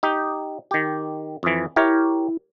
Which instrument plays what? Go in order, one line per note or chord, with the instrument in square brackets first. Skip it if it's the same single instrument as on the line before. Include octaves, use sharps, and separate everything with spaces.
[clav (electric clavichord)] D#4 G4
D#3 G4
F2 E3
[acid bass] E4 [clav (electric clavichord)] G4 A#4 C#5